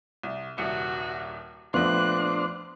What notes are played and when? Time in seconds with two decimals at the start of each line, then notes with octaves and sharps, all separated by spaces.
0.23 C2
0.58 D#1 C2 F#4 C#7
1.74 A#1 F3 A3 B3 D4 C5 C6 F#6